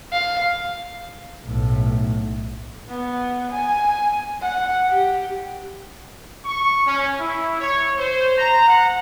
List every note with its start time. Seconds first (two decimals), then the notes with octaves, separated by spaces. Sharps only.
0.12 F5
1.45 B1 A2
2.89 B3
3.51 G#5
4.42 F#5
4.89 G4
6.45 C#6
6.86 C#4
7.20 E4
7.60 C#5
7.98 C5
8.38 A#5
8.68 F#5